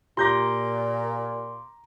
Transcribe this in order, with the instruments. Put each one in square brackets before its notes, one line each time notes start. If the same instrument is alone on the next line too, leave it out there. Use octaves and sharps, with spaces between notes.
[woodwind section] A#2 [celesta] F4 G4 [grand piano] A#5 G6 A#6 [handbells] C6 D6